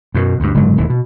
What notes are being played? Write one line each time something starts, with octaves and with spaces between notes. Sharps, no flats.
F#2 B2
D2 G2
F#1 G#2 D3 F#3
E1 D#2 E3
B2